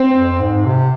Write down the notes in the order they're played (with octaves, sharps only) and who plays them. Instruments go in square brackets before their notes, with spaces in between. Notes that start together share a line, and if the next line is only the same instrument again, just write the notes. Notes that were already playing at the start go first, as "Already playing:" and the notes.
Already playing: [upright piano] C4
[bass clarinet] F2
G#2
C3